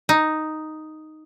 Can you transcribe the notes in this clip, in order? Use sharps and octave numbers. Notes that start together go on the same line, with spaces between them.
D#4